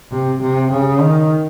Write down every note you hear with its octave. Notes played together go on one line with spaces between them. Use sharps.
C3
C3
C#3
D#3